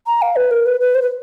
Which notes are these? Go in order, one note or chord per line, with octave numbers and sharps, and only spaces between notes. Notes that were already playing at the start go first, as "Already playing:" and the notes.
A#5
F5
B4
A#4
B4
B4
C5
B4